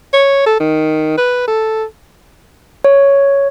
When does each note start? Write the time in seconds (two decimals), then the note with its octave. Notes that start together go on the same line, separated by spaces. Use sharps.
0.13 C#5
0.46 A4
0.60 D#3
1.18 B4
1.48 A4
2.84 C#5